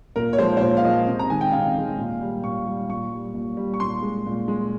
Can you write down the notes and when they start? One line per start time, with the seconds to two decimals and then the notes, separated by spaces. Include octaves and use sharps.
0.16 A#2 A#4
0.33 C#5
0.38 F3 G#3 C5
0.57 C5
0.61 A#2 C#5
0.77 F5
0.84 F3 G#3 D#5
1.07 C3
1.19 A#5
1.30 D#3 G#3 G#5
1.41 G5
1.52 C3 F5
1.76 D#3 G#3
1.98 A#2
2.21 G3
2.43 A#2 C#6
2.66 G3
2.89 A#2 C#6
3.12 G3
3.34 A#2
3.57 G3
3.74 C#6
3.80 A#2 C6
4.03 G#3
4.26 A#2
4.48 G#3